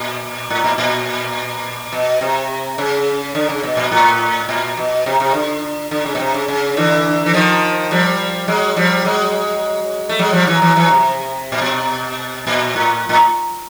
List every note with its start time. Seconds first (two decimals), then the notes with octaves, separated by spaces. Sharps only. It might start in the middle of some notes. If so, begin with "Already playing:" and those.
Already playing: A#2
0.50 A2
0.64 A#2
0.78 A#2
1.92 B2
2.21 C3
2.78 C#3
3.35 D3
3.49 C#3
3.63 B2
3.77 A#2
3.92 A2
4.49 A#2
4.77 B2
5.06 C3
5.20 C3
5.34 D3
5.91 D3
6.06 C#3
6.15 B2
6.20 C3
6.34 C#3
6.48 C#3
6.77 D3 E3
7.26 E3
7.33 D#3 F3
7.91 F3 G3
8.48 F#3 G#3
8.76 F3 G3
9.05 F#3 G#3
10.09 A3
10.19 F#3 G#3
10.33 F3 G3
10.47 E3 F#3
10.62 E3 F#3
10.76 E3 F#3
10.91 C3
11.52 A#2
11.62 B2
12.47 A#2
12.76 A2
13.09 A2